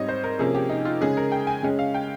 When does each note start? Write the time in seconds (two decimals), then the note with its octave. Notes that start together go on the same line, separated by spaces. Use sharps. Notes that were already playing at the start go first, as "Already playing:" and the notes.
Already playing: G#2 G3 C4 C#5 D#5
0.09 C5
0.24 A#4
0.39 C3 F3 A#3 C#4 G#4
0.55 G4
0.70 D#4
0.85 F4
1.01 C#3 G#3 C#4 G#4
1.17 A#4
1.32 G5
1.47 G#5
1.63 C#3 G#3 C#4
1.79 F5
1.94 G5